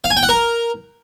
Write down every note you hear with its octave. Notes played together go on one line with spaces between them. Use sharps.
F5
G#5
G5
F#5
A#4